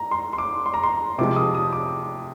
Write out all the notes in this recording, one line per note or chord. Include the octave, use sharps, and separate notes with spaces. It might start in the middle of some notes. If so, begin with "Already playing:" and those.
Already playing: A#5
C6
C6
D6
C6
A#5
C6
C3 F3 G#3 D6
D#6
D#6
D6